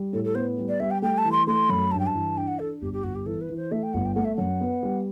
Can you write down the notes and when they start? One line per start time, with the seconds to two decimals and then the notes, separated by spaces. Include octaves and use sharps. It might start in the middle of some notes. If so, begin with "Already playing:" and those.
Already playing: G3
0.13 A2 A4
0.24 A4
0.35 B3 C5
0.58 G3
0.69 D5
0.80 G3 E5
0.91 G5
1.02 A3 G5
1.18 A5
1.25 E3
1.32 C6
1.47 A3 C6
1.69 F#2 B5
1.91 G2 A5
1.99 G5
2.07 A5
2.14 E3
2.37 D4 G5
2.47 F#5
2.59 D4 A4
2.81 G1 G4
2.93 G4
3.03 G1 F#4
3.15 G4
3.26 E3 A4
3.41 B4
3.49 E3
3.56 C5
3.71 A3 E5
3.83 G5
3.94 G1 F#5
4.05 G5
4.15 A3 F#5
4.25 E5
4.36 F#2 F#5
4.61 B3
4.83 G3